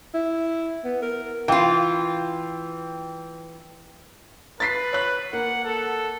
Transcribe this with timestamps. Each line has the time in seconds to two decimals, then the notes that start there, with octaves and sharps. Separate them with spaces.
0.14 E4
0.84 B3
1.02 A#4
1.48 E3 F4 G5
4.60 B4 A6 B6 C7
4.93 C#5 F#6
5.33 A#3 F#5
5.64 A4